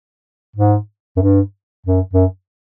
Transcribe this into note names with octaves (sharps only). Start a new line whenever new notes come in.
G#2
F#2
G2
F#2
F#2